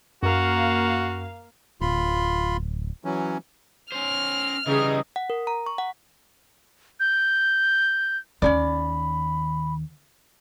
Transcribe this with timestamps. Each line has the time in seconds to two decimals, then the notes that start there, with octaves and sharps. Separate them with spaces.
0.23 F#2 A#3 F#4 F5
1.81 D1 F4 B5 C6
3.05 E3 F#3 C#4
3.92 C#4 C5 F6
4.67 C#3 E3 G3 D#4 G#4 D#5
5.16 F#5
5.30 A#4
5.47 A#5
5.66 C#6
5.78 F#5
7.00 G6
8.42 D#2 D#3 C#4 D#4 D5 B5